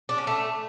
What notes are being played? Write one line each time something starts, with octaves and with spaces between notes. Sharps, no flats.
D4
C#4
A3